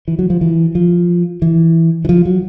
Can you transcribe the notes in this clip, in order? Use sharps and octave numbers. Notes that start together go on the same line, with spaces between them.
E3
F#3
F3
E3
F3
E3
E3
F3
F#3